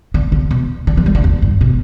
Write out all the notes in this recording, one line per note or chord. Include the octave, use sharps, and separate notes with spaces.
D3
D3
B2
D3
E3
G3
D3
E2
G2
B2